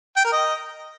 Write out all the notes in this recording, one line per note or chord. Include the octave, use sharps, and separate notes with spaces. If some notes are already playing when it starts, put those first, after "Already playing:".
G5
A#4
D#5